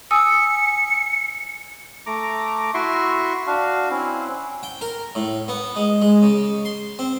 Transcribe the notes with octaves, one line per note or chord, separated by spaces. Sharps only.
G#5 D#6 E6 C#7
A3 A#5 D6
E4 F#4 E5 C6 C#6
D4 F#4 F5
C4 C#4 E4
G5
A#4
A2
B3
G#3
G#3
C#3
C6
C4